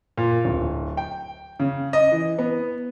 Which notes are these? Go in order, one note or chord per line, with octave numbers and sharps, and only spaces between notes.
A#2
D1
G5
C#3
D#5
E3
B3